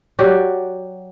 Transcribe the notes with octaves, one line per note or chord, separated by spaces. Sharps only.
F#3 F#4 G4 D5